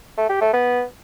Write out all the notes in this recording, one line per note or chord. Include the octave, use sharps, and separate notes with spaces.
A3
G4
A3
B3